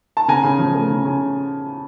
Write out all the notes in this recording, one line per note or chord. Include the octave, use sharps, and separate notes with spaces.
A5
C#3 G#5 A#5
C#3
F3
A3
C#3
C#3